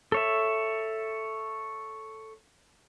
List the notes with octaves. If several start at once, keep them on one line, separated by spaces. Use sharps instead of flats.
A4 C#5 E5